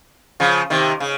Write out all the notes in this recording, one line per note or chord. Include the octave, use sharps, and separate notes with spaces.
C#3 F3
C3 D#3
C#3